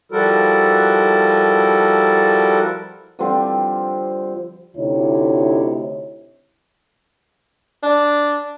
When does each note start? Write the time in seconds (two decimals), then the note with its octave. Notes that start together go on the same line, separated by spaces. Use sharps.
0.12 F3 G3 E4 F#4 A4 A#4
3.19 D3 F3 G3 C4
4.77 D2 C3 D#4 E4 C#5
7.83 D4